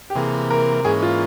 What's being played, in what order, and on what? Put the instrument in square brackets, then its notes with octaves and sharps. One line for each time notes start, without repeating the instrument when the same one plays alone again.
[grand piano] G4
[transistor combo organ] C3 E3 A#3 [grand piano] G#4
[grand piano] A#4
[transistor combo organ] G#2 E3 A#3 C#4 [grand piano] G#4
[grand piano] F4